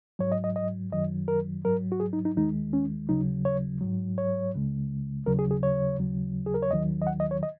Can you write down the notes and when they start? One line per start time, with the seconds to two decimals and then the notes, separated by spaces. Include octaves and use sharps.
0.19 G#2 F#3 C#5
0.32 D#5
0.44 D#5
0.56 D#5
0.92 F#2 D#3 F#3 D#5
1.28 A#4
1.64 G#2 F#3 A#4
1.92 F#4
2.00 G#4
2.13 D#4
2.25 D#4
2.36 D#2 D#3 G#3 D#4
2.73 C#4
3.09 D#2 C#3 F#3 D#4
3.45 C#5
3.81 G#2 F#3
4.18 C#5
4.54 C#2 C#3 G#3
5.26 D#2 C#3 F#3 A#4
5.39 G#4
5.51 G#4
5.63 C#5
5.98 D#2 C#3 F#3
6.46 G#4
6.54 A#4
6.62 C#5
6.71 D#2 D#3 F#3 D#5
7.02 D#5
7.07 F#5
7.20 D#5
7.31 C#5
7.43 D#5